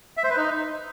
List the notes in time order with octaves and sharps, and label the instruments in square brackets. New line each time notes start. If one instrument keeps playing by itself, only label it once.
[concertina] E5
C5
B4
D#4